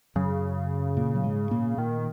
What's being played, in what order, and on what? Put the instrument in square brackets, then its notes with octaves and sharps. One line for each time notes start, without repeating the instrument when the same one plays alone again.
[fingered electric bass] F#2 F#3 [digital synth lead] C#3
[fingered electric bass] A#2 A#3
F#3
G#2 G#3
A#2 A#3
[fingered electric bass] A#2 A#3 [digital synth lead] D#3